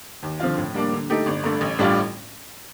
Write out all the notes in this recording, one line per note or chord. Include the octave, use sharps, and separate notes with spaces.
D#2
D3 F3 C4 F4
A2
G3 A#3 D4
D3
A3 D#4 G4
G1
G2 D3 A3
A1
A2 G3 D4 F4